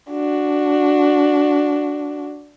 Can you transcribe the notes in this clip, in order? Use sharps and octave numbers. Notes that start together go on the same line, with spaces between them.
D4 F#4